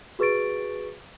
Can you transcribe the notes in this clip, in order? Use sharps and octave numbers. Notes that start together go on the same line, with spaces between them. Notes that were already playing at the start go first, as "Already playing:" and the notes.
F#4 G#4 B4 C#6 A6 D7